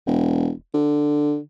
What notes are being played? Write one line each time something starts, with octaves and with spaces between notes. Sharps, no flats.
E1
D3